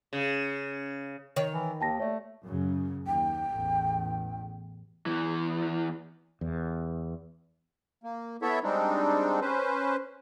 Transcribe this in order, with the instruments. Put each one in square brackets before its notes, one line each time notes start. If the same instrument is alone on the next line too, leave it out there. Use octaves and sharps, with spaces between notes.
[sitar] C#3
[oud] D#3 C#5
[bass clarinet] E3
[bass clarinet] D#2 [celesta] G5 A5 A#6
[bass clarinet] A3 [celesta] C#5 D5
[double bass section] F#2 C#3
[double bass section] D#2 [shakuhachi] G5
[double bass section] A1 E2
[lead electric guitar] E2 E3
[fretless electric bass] E2
[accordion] A#3
B3 E4 A4 C#5 E5
G3 G#3 C4 D4 D#4
C#4 B4 C5